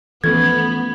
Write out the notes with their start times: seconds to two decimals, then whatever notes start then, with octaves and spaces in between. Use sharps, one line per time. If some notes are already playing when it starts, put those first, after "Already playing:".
0.24 E3 F3 A3 B3 C#4 F4 A4 G#6